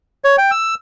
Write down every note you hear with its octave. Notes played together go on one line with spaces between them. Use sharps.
C#5
G5
E6